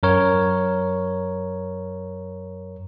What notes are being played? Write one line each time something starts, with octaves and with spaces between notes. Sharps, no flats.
F#2 A#4 C#5